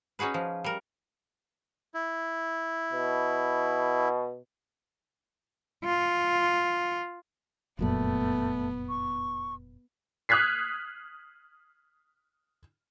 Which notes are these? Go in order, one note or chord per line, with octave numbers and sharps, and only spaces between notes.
C#4 D#4 F#4 G#4 B4
F3
G3 A#4
E4
B2
F4
F1 F#2 A#2 A3 B3
C#6
D#6 F6 F#6 G#6 B6 C7